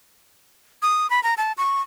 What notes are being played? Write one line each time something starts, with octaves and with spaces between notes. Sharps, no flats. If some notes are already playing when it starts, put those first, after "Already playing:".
D#6
B5
A#5
A5
C#6